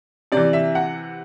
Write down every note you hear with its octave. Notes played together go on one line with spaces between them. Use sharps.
C3 E3 D5
E5
F#5